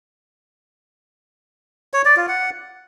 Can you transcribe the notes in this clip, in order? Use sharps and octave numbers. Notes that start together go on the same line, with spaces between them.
C#5
D5
F4
F#5